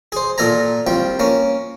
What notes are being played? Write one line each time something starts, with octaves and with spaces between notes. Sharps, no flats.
G#4 C5
A#2 A4 A#4 G#5 A#5
C2 F3 G5
A#3 C#4